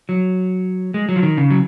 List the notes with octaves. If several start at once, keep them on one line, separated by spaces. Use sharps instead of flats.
F#3
G#3
F#3
F3
D#3
C#3
F#3